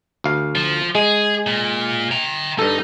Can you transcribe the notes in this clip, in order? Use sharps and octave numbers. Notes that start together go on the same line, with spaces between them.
D2 F5
F3
G#3 G#4
A#2
G5 A#5
G2 D#4 A4